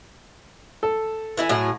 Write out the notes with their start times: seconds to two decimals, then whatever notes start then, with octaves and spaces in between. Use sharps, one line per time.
0.83 A4
1.37 E3 E4 G#5
1.49 A2 F#3 G#4